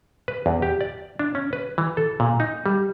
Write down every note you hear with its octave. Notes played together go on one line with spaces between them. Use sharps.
B4
E2
G4
D5
D4
C#4
B4
E3
A4
A#2
D#4
G3